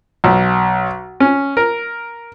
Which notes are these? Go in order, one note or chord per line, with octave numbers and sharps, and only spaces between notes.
B1
C#4
A#4